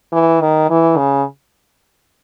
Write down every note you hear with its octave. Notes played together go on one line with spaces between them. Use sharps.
E3
D#3
E3
C#3